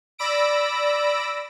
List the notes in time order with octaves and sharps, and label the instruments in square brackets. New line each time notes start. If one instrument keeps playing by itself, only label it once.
[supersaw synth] D5 B5 E6 A#6 D7